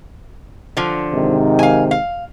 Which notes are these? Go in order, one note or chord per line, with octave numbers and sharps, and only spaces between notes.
D3 F3
G#2 C3 D#3
F5 G#5
F5